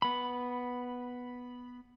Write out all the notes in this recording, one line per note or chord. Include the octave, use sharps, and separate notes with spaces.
B3 B5